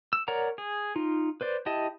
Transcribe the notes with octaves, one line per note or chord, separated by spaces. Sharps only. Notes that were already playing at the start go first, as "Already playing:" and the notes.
E6
A#4 C#5 D5 F#5 A#5
G#4
D#4 F4
B4 C5 D5
E4 G4 D#5 A5